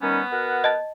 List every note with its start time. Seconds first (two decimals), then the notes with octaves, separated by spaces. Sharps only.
0.02 D#3 G3 B3 C#4
0.32 B2 A#4 F#5
0.64 D#5 A5 A6